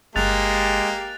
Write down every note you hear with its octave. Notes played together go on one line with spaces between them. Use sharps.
G1 G#3 A#3 G4 F#6 A6 F7